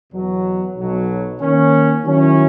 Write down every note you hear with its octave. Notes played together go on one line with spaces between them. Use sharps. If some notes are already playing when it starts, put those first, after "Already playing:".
E2 B2 F#3
B1 B2 F#3
D#3 A#3 C#4
D#3 F#3 C#4 E4